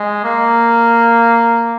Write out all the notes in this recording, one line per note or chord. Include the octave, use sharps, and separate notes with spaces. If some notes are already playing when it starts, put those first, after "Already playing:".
Already playing: G#3
A#3